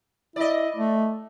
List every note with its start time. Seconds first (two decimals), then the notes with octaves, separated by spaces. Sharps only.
0.36 E4 D5 D#5
0.77 A3